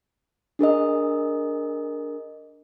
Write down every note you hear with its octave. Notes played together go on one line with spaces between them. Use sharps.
D4 G#4 A#4 D#5